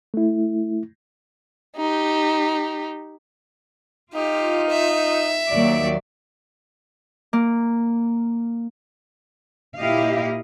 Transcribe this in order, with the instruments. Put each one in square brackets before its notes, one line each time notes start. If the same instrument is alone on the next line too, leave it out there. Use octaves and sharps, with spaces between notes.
[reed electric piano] A3 E4
[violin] D#4 G4
[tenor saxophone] D#4 [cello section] F4 [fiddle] G4
[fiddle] E5
[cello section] D#2 F#3 D5
[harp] A#3
[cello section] A#2 E4 G4 D#5 F5